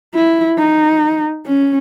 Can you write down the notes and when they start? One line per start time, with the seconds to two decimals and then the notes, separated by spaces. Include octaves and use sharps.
0.15 E4
0.58 D#4
1.46 C#4